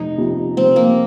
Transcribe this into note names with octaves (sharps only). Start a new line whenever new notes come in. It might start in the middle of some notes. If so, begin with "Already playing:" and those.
Already playing: F1 D#4
F2 C3 F3
F1 C4
A#3